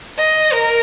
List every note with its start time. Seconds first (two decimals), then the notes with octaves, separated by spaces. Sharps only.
0.19 D#5
0.53 A#4